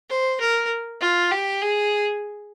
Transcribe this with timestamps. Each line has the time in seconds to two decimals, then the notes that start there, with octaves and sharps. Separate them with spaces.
0.09 C5
0.40 A#4
1.01 F4
1.31 G4
1.62 G#4